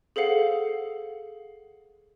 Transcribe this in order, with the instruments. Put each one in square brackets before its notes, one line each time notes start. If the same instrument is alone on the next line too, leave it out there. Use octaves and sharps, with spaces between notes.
[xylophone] G#4 A4 C5 F5 F#5